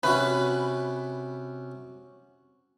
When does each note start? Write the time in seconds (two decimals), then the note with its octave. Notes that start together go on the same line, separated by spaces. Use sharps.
0.03 C3 C#4 F#4 B4